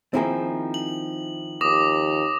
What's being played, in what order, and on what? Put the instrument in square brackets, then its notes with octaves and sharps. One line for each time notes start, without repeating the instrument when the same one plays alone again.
[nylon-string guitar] D#3 F3 A#3 [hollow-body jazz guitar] C4 E4 G#4
[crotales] F#7
[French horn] D#2 [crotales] D6 D#6 A#6